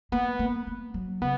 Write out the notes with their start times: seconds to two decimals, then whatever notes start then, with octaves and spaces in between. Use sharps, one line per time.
0.12 A#3 B3
0.39 A#3
0.67 A#3
0.94 F#3
1.22 C#3 B3